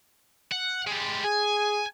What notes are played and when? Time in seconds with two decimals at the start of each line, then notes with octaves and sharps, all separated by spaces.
0.52 F#5
0.87 G3 G#3
1.24 G#4 G#5